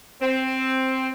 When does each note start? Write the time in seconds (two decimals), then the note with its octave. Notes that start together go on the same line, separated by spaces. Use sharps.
0.21 C4